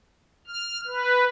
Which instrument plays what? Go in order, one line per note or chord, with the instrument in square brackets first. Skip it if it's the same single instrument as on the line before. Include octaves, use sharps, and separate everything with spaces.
[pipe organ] F6
B4